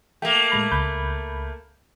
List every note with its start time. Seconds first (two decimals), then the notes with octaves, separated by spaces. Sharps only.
0.22 A3 A#3 G5
0.52 A2 G#3 B5
0.71 C#2 B5 G6